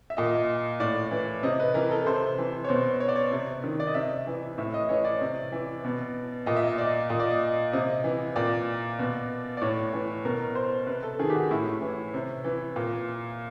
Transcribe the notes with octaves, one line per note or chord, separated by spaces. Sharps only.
E5
A#2 D#5
A2 D5
E3
C3 D#5
B4
E3 A#4
A4
C3 C5
E3
C#5
B2 C5
C#5
D5
C#5
C3
D#3
D5
D#5
C3 E5
E3
A2 E5
D#5
E3 C#5
D5
C3
E3
B2
A#2 D#5
E5
D#5
D5
A#2 D#5
D5
D#5
C3 D#5
E3
A#2 D5
B2
D5
A2 C#5
E3
B2 A#4
C5
C3 B4
A4
D#3 G#4
G4
F#4
A2 E4
E3
C3
E3
A#2